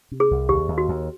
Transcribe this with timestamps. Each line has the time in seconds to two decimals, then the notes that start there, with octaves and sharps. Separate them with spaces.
0.11 C3
0.20 G#4
0.31 C2
0.49 D#2 G4
0.68 D#2
0.78 F#4
0.88 D#2